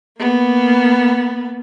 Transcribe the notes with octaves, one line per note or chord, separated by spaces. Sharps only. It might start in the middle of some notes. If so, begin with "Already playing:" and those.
A#3 B3